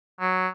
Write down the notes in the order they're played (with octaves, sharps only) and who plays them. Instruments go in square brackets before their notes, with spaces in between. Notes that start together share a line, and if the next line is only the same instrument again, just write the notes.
[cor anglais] F#3